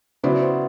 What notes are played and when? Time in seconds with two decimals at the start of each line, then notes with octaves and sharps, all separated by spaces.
0.23 C#3 F#3 B3 E4 C5 D5
0.42 C5